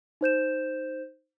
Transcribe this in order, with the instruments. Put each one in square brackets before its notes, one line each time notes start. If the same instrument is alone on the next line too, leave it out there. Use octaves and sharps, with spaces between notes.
[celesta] D#4 C5 G6 E7